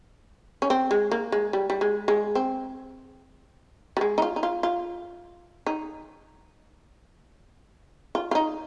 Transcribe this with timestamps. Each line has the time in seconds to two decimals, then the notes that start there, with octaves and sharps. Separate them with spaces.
0.62 C#4
0.70 C4
0.91 G#3
1.12 A#3
1.32 G#3
1.53 G3
1.70 G3
1.81 G#3
2.08 G#3
2.35 C4
3.97 G3
4.01 G#3
4.18 D#4
4.22 F4
4.36 D#4
4.43 F4
4.63 F4
5.67 D#4
8.15 F4
8.31 F4
8.35 D#4